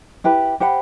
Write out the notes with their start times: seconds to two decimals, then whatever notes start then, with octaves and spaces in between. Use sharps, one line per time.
0.24 E4 G4 B4
0.60 G4 C5 F#5 B5